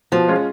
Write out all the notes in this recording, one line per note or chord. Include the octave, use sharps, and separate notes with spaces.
B2 F3
G#3 C#4 F4